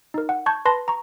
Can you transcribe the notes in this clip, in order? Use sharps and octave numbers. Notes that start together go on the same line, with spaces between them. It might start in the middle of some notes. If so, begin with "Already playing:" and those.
D#4 A#4
F#5
A5 C#6 G6 G#6
B4 A5 B5 C6 A#6
A#5 C#6